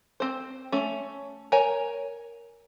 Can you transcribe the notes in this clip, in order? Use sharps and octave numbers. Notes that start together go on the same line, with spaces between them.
C4 C5
A3 C#4
A#4 C#5 G#5